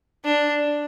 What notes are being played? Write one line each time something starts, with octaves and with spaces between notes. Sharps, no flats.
D4